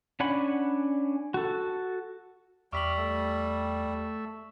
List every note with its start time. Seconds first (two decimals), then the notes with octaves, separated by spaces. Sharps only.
0.20 C#4 D4 F#5 G#5 B5
1.34 F#4 A4
2.73 E2 G3 E5 C#6 D6 F6 B6 F#7
2.98 A3 E5